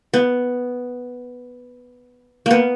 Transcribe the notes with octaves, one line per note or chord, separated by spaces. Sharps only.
B3
A#3 B3